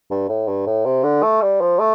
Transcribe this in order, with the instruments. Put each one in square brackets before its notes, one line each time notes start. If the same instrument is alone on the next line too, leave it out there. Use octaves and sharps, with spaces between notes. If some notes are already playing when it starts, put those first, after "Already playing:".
[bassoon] G2
A2
G2
A2
C3
D3
A3
G3
F3
A3